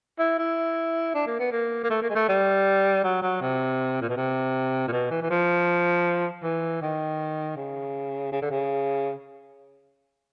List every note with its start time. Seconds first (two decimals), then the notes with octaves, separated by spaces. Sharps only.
0.19 E4
0.39 E4
1.14 D4
1.27 A#3
1.40 B3
1.52 A#3
1.84 A#3
1.90 A3
2.02 A#3
2.10 G#3
2.15 A3
2.28 G3
3.04 F#3
3.22 F#3
3.42 C3
4.01 A#2
4.09 B2
4.17 C3
4.88 A#2
4.92 B2
5.11 E3
5.22 E3
5.30 F3
6.43 E3
6.82 D#3
7.56 C#3
8.32 C#3
8.42 D3
8.51 C#3